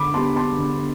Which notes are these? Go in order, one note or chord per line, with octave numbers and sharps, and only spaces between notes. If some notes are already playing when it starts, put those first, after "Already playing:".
Already playing: D3 B5 D6
G3 B3 A5 C6
A5 C6
D3